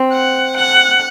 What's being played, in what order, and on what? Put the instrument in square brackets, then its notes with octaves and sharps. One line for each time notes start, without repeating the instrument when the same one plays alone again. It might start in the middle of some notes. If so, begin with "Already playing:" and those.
Already playing: [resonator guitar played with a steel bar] C4
[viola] F#5
F#5